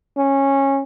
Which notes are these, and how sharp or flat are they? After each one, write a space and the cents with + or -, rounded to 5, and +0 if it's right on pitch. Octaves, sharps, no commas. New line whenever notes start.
C#4 -15